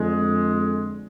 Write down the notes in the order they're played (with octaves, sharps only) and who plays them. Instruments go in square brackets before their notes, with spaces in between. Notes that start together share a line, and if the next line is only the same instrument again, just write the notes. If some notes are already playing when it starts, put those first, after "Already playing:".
Already playing: [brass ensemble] F2 D3 G#3